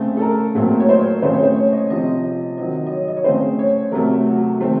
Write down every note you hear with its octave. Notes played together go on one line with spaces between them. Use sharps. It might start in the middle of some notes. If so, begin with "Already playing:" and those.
Already playing: C#3 A3 C4
A4
A#4
A#2 F#3 A3 C4
C#5
C5
C#3 A3 C4 C5
C#5
C5
C#5
D#5
C3 F3 C4 D#5
D#5
D#3 F#3 C4 D#5
D#5
C#5
D#5
C#5
C#3 A3 C4 C5
C#5
C3 F#3 A3 A#4
F#4
D#3 A3 C4